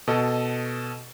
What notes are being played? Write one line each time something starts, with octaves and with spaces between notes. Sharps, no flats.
B2 A4 D#5